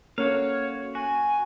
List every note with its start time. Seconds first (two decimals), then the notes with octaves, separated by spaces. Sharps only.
0.18 A#3 C#4 F#4 A4 C#5 F5
0.95 F#4 G#5